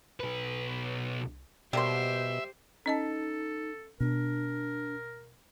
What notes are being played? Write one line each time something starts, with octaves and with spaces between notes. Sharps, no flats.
B1 B4
B2 G3 A#3 G4 C5 E5 C6
C#4 D#4 A4 D#5 A5
B2 D4 A#4